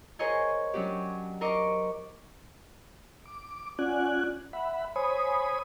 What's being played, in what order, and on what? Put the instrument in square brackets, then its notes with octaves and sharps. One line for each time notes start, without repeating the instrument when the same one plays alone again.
[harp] G#4 A#4 C5 C#5 D#5 G#5
F#3 C#4 D4 F#4 G4
A#4 C5 D#5 C#6 D6
[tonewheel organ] D6
C#4 F4 D5 F#5 G#5 F#6
E5 F#5 B5
C5 C#5 G#5 B5 D#6